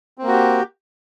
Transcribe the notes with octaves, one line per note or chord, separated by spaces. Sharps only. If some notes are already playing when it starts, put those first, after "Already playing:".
A#3 C4 F#4 G4